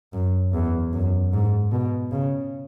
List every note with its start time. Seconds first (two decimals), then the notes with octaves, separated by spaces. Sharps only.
0.13 F#2
0.54 E2
0.93 F#2
1.33 G#2
1.72 B2
2.12 C#3